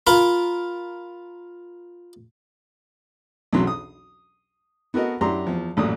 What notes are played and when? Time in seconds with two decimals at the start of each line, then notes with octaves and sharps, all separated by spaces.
0.07 F4 A#4 B5
3.53 B1 E2 F#3 C#4 C6
3.67 D#6
4.94 B3 F#4 A4 A#4 D#5
5.21 F#2 D4 E4 G4 A#5 C6
5.47 E2 F3
5.77 A1 F#2 A#2 F#3 D#6